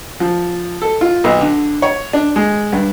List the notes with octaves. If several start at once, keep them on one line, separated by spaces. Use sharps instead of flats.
F3
A4
F4
B1
D3
C#5
D4
G#3
G2